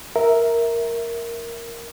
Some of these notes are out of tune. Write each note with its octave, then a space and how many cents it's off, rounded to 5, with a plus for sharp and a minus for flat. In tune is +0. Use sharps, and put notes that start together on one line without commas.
A#4 +0 E5 -5